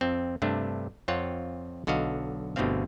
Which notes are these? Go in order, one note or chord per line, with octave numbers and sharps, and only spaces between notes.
F2 C4
G2 C3 A3 D4
F2 C4 F4 C#5 F#5
B1 D3 F#4 D#5 F5
G1 B2 D3 A3 C4 F5